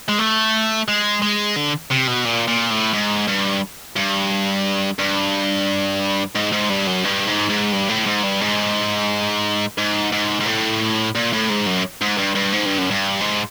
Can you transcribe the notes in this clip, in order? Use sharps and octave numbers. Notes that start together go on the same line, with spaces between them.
G#3
A3
G#3
G#3
D3
C3
B2
A#2
A#2
A2
G#2
G2
G2
G2
G#2
G#2
G2
F#2
G2
G#2
G#2
G2
A2
G#2
G2
G#2
G#2
G#2
G#2
A2
A#2
A2
G#2
F#2
G#2
G2
G2
G#2
G2
F#2
G2
G#2